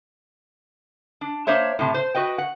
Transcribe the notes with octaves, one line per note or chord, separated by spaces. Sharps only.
D4
A#3 D4 C5 C#5 E5
A2 C3 A5
C5
F#4 B4 D#5 G5
F#5